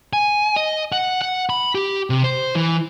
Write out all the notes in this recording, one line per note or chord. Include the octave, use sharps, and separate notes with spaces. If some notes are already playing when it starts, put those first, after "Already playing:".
G#5
D#5
F#5
F#5
B5
G4
C3
C5
E3